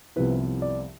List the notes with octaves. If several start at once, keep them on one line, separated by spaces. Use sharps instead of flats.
C2 C3 F3 B3 E4 B4
D5